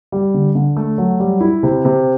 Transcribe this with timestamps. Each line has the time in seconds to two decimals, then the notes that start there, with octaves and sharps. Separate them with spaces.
0.12 G3
0.34 D3
0.55 D3
0.77 A3
0.98 F#3
1.20 G3
1.41 E4
1.63 C3
1.85 C3